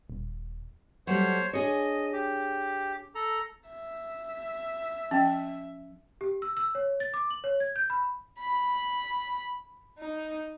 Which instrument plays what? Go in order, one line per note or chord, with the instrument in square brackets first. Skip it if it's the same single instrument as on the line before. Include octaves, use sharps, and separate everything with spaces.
[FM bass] D#1
[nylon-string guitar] F#3 G3 A3 [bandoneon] C5 C#5
[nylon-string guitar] D4 G#4 C#5 [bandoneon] D#5
[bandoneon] G4
A4 A#5
[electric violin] E5
[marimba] F3 G5 [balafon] C#4
[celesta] G4
E6
E6
C#5
A6
D6
F#7
C#5
G#6
G6
B5
[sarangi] B5
D#4